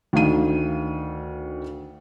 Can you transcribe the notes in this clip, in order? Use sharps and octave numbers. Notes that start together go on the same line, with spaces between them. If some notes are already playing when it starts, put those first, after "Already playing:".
D2 D#3 F5 D#7